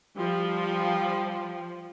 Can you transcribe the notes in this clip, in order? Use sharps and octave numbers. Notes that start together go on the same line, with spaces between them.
F3 G3